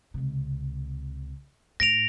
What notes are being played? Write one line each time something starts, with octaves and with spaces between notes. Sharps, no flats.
C#2 C3
A2 A#6 D7 F7